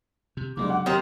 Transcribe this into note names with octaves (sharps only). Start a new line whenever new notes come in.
C3
C2 C#3 F#3 G#3 D4 D6
F#5
D#3 C4 G4 A#4 B6